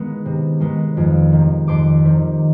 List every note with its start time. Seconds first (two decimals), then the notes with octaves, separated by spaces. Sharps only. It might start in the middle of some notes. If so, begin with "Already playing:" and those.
Already playing: D#3 G#3 B3
0.26 C3
0.60 D#3 G#3 B3
0.97 F2
1.32 C3 D#3
1.68 F2 C6 D6
2.04 C3 D#3